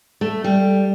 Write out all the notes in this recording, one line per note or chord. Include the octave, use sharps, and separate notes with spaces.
A3
G3